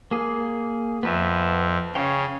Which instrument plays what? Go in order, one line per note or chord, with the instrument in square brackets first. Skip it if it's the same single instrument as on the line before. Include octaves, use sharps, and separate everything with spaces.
[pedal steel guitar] A#3 G#4
[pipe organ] F2 [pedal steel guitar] B3 B4 E5
[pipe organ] C#3 [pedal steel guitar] C#5 F5 G5